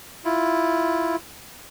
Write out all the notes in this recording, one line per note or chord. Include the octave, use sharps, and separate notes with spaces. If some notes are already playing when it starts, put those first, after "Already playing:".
E4 F4